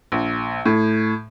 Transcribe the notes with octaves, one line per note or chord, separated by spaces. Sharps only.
A#1
A2